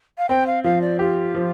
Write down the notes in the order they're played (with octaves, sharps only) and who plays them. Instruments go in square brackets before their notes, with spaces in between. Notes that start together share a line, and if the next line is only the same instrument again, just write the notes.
[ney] F5
[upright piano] C4 [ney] G5
[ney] F5
[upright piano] F3 [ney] F5
[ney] D5
[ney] F4 [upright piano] G4
[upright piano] F3